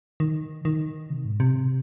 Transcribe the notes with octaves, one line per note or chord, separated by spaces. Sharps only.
D#3
D#3
C3
G#2
C3